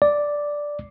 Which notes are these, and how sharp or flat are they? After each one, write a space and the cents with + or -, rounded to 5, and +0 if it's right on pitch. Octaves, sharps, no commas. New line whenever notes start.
D5 +0